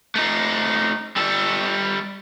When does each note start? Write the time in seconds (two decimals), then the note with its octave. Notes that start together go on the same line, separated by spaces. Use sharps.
0.15 A3 D#4
1.16 G3 A4